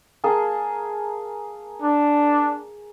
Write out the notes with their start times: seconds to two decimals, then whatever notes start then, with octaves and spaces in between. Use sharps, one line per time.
0.24 A#3 G#4 A5
1.82 D4